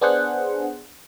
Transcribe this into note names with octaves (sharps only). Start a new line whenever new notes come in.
B3 D4 G#4 C5 F#5